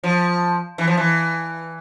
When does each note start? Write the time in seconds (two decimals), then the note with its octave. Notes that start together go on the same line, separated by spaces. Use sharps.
0.03 F3
0.78 E3
0.87 F3
0.97 E3